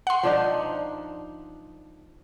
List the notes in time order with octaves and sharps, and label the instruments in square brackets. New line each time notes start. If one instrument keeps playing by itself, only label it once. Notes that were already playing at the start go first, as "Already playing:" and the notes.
[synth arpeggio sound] F#5 C6
[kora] F3 D4 D#4